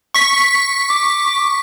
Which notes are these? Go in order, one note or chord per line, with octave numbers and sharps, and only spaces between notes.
C#6 B6
D6